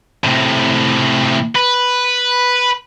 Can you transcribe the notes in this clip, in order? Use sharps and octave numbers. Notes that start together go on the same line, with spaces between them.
A2 C3
B4